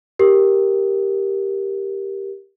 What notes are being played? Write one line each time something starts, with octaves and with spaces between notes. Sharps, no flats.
G4 A#4